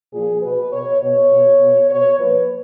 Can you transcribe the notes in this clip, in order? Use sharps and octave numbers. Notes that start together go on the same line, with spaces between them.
A#2 F3 G#4
B2 B4
B2 C#5
B2 C#5
B2
B2
B2 C#5
A#2 F3 B4